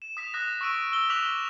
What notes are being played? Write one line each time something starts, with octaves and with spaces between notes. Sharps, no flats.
E7
D#6 B6
D#6 F#6 A#6
C#6 E6 A#6 D7 D#7
E6 G7
D6 F6 F#6 B6 F7 F#7